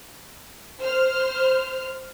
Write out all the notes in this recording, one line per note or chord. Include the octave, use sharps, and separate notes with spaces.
C5 F6